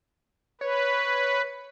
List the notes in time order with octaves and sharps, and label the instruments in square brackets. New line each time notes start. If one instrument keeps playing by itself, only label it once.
[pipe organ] B4 [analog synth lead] C#5